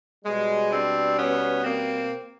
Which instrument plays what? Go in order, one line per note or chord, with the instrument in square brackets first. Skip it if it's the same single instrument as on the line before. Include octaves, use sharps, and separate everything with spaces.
[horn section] B2 G3 G#3
C4 D4
B3 C#4
A#3 C4